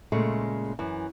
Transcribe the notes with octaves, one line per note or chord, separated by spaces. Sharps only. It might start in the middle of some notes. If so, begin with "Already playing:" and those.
A#2 C#3 G#3 A3
F#2 E3